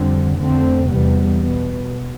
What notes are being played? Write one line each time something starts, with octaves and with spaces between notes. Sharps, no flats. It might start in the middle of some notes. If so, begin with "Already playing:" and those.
Already playing: F2 D3 G3 C4
F2 D3 A3 C4
E2 C3 G3 B3
B2 B3